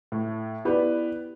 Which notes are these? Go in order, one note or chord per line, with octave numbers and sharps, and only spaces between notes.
A2
B3 E4 G4 B4 D5